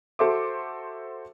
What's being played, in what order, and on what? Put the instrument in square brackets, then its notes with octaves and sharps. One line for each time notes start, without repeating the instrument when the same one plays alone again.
[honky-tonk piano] F#4 A4 C5 E5 C6 D6